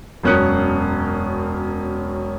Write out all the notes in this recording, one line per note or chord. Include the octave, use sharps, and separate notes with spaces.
E1 F#2 C#4 D#6 F#6 C#7